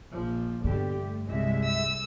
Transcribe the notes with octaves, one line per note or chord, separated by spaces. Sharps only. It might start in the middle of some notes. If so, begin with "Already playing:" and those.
A#1 F3
G2 B2 D3 G4
A3
C2 G#3 E5
E6